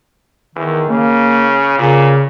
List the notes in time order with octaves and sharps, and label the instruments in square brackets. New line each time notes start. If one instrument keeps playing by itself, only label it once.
[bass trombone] E2 [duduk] D#3
[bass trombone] C#3 [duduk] A#3
[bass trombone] A#2 [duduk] C#3